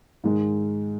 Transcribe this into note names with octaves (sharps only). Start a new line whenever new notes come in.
G#2 D#3 G#3